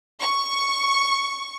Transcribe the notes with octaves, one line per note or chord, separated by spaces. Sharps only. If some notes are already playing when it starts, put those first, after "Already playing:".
C#6